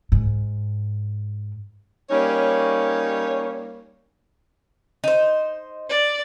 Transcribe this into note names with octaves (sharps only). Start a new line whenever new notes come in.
G#2
G3 A#3 C#4 D#4 C#5
D#4 C5
D5